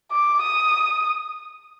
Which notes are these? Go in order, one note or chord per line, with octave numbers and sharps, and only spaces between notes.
D6
D#6